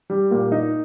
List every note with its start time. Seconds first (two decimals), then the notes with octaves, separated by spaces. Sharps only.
0.10 G3
0.31 A#2
0.52 D#4